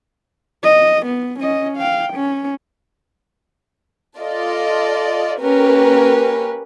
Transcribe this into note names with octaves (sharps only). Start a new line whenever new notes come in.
D#5
B3
C#4 D#5
F5 G5
C#4
F4 A4 D5 D#5
A#3 C#4 G4 A#4 B4